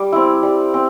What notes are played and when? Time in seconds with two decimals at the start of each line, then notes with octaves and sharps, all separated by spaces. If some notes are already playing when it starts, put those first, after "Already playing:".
Already playing: G3 D6
0.12 C4 E4
0.43 G3
0.74 C4